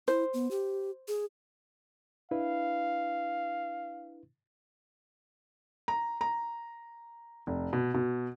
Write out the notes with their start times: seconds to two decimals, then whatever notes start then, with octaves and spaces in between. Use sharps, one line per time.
0.08 E4 C5
0.34 B3
0.51 G4
1.08 G#4
2.31 D4 E4 B4 F5
5.88 A#5
6.21 A#5
7.47 F1
7.73 B2
7.94 B2